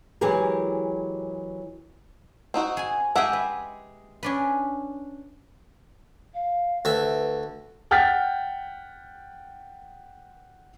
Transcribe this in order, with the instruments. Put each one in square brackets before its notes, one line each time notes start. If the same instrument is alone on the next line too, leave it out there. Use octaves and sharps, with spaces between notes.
[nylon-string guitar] E3 F#3 G#3 G4 G#4 A#4
[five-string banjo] C4 D#4 F#4
[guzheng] G#4 G#5
[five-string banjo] G#3 E5 F#5 [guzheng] G4 G#4 G5
[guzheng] B4
C#4 D4 B4
[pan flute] F5
[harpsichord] D2 E5 [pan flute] B4
[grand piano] F#5 G5 F6 G6 A6 B6